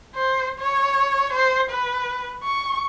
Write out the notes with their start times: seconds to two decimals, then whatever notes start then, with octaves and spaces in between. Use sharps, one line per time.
0.15 C5
0.59 C#5
1.33 C5
1.70 B4
2.44 C#6